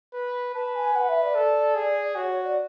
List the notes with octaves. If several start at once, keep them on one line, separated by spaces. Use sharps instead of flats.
B4
B4 A5
G#5
B4 F#5
E5
D5
A4
G#4
F#4 C#5
C#5
D5